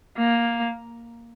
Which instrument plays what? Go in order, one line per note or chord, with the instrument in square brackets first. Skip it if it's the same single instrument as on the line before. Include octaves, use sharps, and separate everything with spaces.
[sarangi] A#3